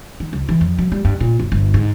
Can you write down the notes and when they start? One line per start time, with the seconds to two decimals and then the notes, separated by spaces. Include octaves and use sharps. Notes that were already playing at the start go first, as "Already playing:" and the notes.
0.20 D#3
0.33 C#2
0.49 E3
0.61 F2
0.79 F#3
0.92 G3
1.05 G2
1.20 A#2
1.39 F#1
1.52 G1
1.74 G#2